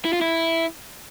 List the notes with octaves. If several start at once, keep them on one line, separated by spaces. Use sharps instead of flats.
E4
F4
E4